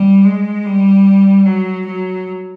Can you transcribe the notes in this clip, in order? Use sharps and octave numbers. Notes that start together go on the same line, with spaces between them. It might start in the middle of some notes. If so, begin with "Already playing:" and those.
Already playing: G3
G#3
G3
F#3
F#3